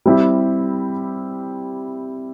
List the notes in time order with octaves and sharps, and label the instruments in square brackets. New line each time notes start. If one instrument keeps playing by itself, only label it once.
[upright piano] G3 C4 E4 G4